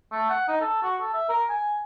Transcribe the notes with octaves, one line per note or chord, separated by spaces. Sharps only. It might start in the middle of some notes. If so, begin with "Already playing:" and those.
A3
F#5
D#4
A4
F#4
A4
E5
A#4
G#5